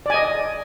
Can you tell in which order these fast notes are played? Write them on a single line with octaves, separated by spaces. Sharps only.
D5 G#5 D#5